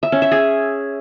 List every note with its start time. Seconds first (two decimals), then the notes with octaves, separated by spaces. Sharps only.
0.03 E5
0.12 C#4
0.22 E5
0.31 G#4